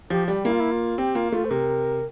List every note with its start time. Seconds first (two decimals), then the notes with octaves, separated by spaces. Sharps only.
0.10 F3 G4
0.28 G3 G4
0.45 A#3 E4
0.52 F4
0.60 E4
0.72 F4
0.98 C4 G4
1.15 A#3 F4
1.32 A3 F4
1.45 C5
1.50 C3 A#4